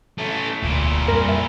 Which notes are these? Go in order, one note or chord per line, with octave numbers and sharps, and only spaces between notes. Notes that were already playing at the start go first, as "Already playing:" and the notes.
A3 C#4
E1 D2 A#2 E4
F2 G3 A#4
E5